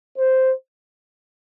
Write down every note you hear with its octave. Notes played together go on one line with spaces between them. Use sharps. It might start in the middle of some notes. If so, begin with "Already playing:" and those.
C5